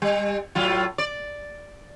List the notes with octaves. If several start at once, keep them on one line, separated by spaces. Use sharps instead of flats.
G3
A2 F#3 F4
D5